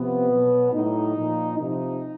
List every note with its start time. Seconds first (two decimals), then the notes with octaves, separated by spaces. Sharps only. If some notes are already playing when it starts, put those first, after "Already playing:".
Already playing: C3 F3 B3
0.30 B2 F#3
0.72 A2 F#3 D#4
1.16 A#2 F3
1.58 C3 F3 D#4